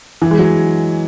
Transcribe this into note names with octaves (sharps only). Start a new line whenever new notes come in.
E3
G#3
F#3